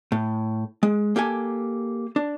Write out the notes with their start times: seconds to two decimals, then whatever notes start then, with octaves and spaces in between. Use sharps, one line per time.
0.12 A2
0.83 G#3
1.16 A#3 G4 A4 G#5
2.16 D4